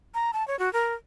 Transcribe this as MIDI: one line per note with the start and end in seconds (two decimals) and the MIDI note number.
0.14 0.31 82
0.33 0.46 81
0.48 0.58 73
0.59 0.72 66
0.73 0.94 70